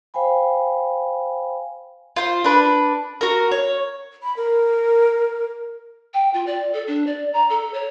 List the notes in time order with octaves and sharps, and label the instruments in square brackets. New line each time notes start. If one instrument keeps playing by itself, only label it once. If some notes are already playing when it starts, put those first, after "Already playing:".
[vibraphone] C5 F5 G5 G#5 B5
[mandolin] F4 C5
D4 B4
F#4 A#4
C#5
[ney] B5
A#4
[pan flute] G5
F4
D5
A4
D4
D5
A#5
A4
C#5